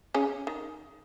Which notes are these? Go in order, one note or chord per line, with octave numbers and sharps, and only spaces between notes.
C#3 C#4
D#3